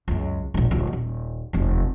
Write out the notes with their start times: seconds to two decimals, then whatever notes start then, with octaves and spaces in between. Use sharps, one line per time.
0.08 C#2 F#2
0.54 E1 A#1
0.71 D#1 D2
0.93 D#1
1.53 F1 D#2